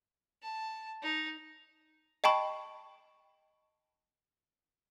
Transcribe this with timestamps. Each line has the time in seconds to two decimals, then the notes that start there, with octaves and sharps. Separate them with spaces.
0.42 A5
1.02 D#4
2.24 D#5 G5 A5 B5 C#6